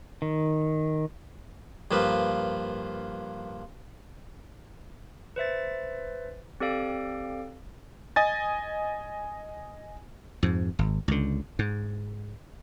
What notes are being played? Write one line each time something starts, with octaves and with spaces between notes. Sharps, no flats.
D#3
G2 F3 A#3 B4
B4 C5 E5 A6
C4 G4 A4 D5 F5 D7
D#5 G#5 A6
F2 G#2
G#1
C#2 D3
G#2